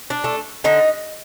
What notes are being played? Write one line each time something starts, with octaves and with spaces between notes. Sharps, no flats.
D4
A3
D3 D#4